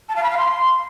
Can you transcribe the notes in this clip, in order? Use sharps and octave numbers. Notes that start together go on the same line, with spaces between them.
A5
F5
B5
F5
C6